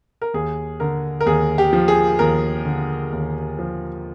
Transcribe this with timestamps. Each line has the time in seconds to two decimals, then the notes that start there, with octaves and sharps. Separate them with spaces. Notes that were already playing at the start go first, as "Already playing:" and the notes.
0.21 A#4
0.34 D#2 G#4
0.80 D3 A#4
1.20 A#4
1.26 D#2 G#4
1.58 G4
1.73 F3
1.88 G#4
2.19 D#2 A#4
2.65 D3
3.13 D#2
3.59 F3